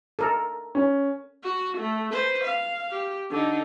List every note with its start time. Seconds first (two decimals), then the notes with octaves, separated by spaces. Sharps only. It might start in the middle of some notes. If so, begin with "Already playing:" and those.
0.19 A4 A#4
0.75 C#4
1.43 F#4
1.78 A3
2.11 B4 C5
2.44 F5
2.91 G4
3.31 D3 D#4